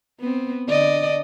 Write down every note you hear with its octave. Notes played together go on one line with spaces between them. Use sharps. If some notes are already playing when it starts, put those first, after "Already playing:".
B3 C4
D3 D5 D#5